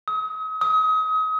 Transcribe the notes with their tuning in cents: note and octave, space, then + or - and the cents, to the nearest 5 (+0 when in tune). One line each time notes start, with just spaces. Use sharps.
D#6 +40
D#6 +30